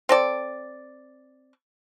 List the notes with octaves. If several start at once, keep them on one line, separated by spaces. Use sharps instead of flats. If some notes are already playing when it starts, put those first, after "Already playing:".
C4 A4 D5